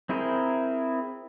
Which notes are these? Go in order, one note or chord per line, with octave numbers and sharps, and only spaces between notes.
C4 E4 G#4 A#4 C5